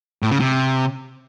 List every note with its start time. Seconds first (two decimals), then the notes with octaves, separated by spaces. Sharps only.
0.22 A2
0.31 C#3
0.40 C3